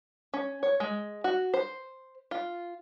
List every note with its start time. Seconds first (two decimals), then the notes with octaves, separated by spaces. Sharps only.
0.34 C#4
0.63 C#5
0.80 G#3
1.24 F#4
1.54 C5
2.31 F4